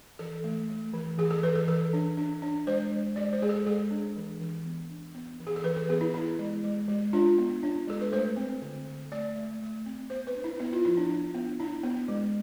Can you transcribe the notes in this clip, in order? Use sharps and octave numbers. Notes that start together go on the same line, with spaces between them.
E3 A4
A3
A3
E3
E3 G#4
A4
E3 B4
A4
E3 A4
D4
D4
D4
G#3 C5
G#3
G#3 D5
C5
G#3 G#4
A4
G#3 G#4
D4
E3
E3
B3
D4
B3
E3
G#4
A4
E3 B4
B4
B3 G#4
E4
B3 E4
G#3
G#3
G#3
D4 F4
B3
D4
G#3 A4
B4
A3 C5
C4
D3
D3
A3 D5
A3
A3
C4
B3 C5
B4
D4
E4
B3 E4
F4
F3 E4
D4
D4
B3
D4 E4
B3
G#3